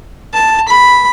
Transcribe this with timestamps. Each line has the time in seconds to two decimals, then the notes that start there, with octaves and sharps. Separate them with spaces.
0.33 A5
0.68 B5